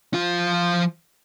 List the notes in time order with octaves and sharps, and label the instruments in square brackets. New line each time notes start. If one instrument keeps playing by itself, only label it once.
[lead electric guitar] F3 F4